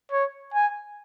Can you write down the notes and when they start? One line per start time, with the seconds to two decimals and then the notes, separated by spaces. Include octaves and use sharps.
0.12 C#5
0.54 G#5